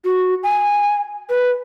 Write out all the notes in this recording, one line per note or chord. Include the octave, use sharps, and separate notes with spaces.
F#4
G#5
B4